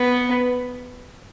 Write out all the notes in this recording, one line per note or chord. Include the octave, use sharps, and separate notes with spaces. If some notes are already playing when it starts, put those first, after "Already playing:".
Already playing: B3